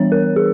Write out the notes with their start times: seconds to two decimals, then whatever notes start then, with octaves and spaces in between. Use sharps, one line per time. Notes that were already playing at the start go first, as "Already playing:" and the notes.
Already playing: E3 G3 B3 D4 C#5
0.12 A#4
0.36 G#4